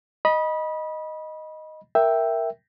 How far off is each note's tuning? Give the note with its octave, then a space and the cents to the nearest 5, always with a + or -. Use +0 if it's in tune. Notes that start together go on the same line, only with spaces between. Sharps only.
D#5 +0 B5 -25
A#4 +0 E5 +0 G5 +0